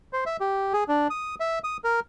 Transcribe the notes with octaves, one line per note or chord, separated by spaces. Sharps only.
C5
E5
G4
G#4
D4
D#6
E5
D#6
A#4